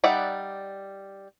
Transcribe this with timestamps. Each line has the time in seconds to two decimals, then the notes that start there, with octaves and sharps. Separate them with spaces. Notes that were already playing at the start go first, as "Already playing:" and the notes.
0.04 G3 D#4 D5 E5 F#5